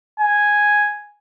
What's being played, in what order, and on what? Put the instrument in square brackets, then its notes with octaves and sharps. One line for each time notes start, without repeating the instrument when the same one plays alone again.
[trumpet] G#5